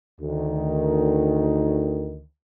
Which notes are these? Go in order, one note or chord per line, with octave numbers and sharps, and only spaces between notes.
D2 D#3